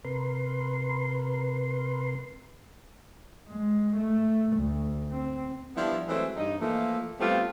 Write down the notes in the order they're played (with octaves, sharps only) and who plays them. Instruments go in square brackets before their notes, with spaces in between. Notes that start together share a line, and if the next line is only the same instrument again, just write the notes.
[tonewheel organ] C3 A#4 B4 C6
[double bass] G#3
A3
D2
C4
[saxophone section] F3 G3 B3 D4 E4
E3 F#3 G#3 A3 C4 E4
G2 D#4
E3 F3 A3 A#3
G3 A3 B3 C4 F4 G4